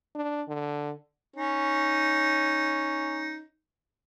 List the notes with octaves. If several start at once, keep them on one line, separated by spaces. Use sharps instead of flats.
D4
D3
C#4 D#4